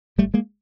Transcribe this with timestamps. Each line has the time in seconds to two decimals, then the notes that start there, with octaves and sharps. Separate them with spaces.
0.18 G#1 G3 A3
0.34 G#3 A#3